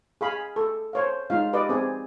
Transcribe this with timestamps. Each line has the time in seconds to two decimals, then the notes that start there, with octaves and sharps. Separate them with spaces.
0.21 G#4 F5 B5
0.56 A4
0.93 C5 C#5 F5
1.30 G#3 D#4 F4 F5
1.53 G4 B4 D5 D#5
1.69 C4 G#4